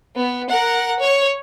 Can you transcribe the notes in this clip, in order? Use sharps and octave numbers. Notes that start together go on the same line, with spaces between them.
B3
A#4 F#5
C#5